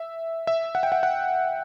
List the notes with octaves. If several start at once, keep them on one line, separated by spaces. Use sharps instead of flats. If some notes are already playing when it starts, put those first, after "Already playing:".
Already playing: E5
E5
F#5
G5
F#5
F#5